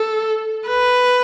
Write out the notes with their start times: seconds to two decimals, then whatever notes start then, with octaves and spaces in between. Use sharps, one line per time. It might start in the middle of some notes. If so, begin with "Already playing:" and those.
Already playing: A4
0.68 B4